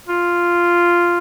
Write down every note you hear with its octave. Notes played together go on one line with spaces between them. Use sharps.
F4